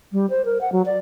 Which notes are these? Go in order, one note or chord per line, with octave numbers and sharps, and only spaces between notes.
G3
C5
A#4
F#5
F#3
D5